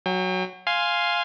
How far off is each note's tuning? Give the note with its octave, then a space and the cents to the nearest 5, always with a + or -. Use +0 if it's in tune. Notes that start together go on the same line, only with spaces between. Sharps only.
F#3 +0 G5 +40
F5 +0 G#5 +0 C6 +0